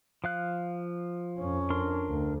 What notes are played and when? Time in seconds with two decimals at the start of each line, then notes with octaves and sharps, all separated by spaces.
0.24 F3 F5 F#6
1.39 F2 C#4
1.70 D4 A#4 C6
2.09 D2